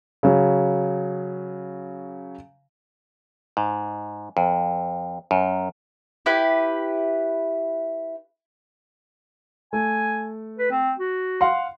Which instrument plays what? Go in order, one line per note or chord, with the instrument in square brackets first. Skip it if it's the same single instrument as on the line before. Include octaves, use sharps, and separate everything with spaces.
[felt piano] C#3 F#3
[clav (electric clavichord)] G#2
F2
F#2
[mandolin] E4 G4 B4
[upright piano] A3 [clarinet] G#5
[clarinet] B4
C4
F#4
[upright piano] F5 F#5 C6